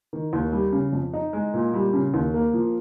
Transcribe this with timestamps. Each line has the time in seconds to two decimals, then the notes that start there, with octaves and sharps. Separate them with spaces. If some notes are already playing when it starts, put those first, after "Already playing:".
0.13 D#3
0.33 D#2
0.53 G3
0.73 C#3
0.93 F2
1.13 D#4
1.33 G#3
1.54 A#2
1.74 G3
1.93 C#3
2.14 D#2
2.34 A#3
2.54 F3